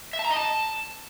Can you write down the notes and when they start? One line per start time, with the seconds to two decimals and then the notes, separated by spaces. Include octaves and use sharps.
0.13 E5
0.19 A5
0.25 A#5
0.30 D#5
0.36 A5